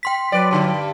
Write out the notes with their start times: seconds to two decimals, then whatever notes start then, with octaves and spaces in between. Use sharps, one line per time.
0.03 G5 C6 B6
0.32 F#3 B4 D5
0.51 G2 D3